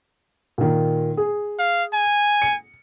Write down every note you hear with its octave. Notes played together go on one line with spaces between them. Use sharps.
A#2 D#3
G#4
F5
G#5
C#7